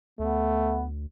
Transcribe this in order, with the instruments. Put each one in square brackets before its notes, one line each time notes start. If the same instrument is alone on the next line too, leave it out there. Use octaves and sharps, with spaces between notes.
[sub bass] D2 [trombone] A3 [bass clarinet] B3